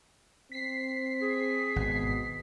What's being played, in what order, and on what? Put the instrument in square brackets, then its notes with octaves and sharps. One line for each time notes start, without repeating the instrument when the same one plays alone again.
[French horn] C4 [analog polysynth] B6 C7
[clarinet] G#4
[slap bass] G#1 [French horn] B2